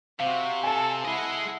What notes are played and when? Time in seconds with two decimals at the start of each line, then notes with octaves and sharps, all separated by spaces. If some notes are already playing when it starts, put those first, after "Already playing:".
0.19 C3 C4 F#4 F5
0.64 A4 G#5 A5
1.05 E4 G#4 D#5 F#5